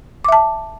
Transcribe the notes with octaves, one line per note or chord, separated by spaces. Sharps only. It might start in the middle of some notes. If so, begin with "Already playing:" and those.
E5 A5 D6